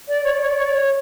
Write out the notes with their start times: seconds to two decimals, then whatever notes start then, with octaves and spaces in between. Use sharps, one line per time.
0.08 D5
0.24 C#5
0.32 D5
0.40 C#5
0.48 D5
0.56 C#5
0.65 D5
0.72 C#5